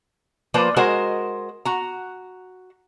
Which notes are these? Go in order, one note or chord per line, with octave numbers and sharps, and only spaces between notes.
F3 A#3 B4 C5 D5
G#3 F#4 A#4 C5 D#5
F#4 A#5